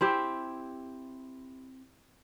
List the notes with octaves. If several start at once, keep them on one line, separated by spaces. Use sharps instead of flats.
C4 E4 G4